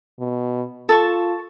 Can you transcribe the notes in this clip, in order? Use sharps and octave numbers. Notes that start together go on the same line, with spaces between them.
B2
F4 A4 A5 C#6